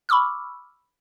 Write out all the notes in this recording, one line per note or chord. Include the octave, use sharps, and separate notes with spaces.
B5 C#6 D6 E6 F6